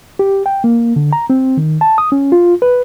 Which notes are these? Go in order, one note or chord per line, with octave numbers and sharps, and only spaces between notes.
G4
G5
A#3
D3
A#5
C4
D#3
A5
D#6
C#4
F4
B4